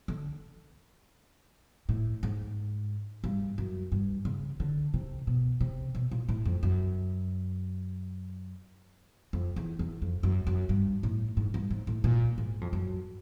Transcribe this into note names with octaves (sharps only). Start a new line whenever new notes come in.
D3
A2
G#2
G2
F#2
G2
C#3
D3
C3
B2
C3
B2
A#2
A2
F2
F#2
F2
E2
E2
F2
F#2
F#2
G2
A2
G#2
G2
G#2
A2
A#2
G#2
F2
F#2